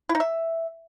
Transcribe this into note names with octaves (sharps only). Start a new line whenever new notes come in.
E4
D#4
E5